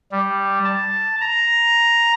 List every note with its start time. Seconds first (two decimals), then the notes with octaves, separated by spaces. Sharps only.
0.12 G3
0.64 A5
1.21 A#5